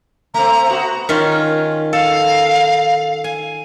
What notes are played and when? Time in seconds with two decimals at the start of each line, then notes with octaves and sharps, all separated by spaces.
0.34 A3 C4 A#5
0.69 B3 F#4
1.09 D#3 C#4 F4
1.93 A4 F5
3.24 G#5